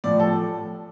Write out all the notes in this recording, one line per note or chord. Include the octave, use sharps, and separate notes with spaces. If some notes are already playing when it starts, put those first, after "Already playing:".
A2 F3 D5
A4